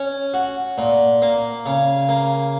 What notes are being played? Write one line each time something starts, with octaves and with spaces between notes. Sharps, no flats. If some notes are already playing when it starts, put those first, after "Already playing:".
Already playing: C#4
F#4
A#2
A#3
C#3
A#3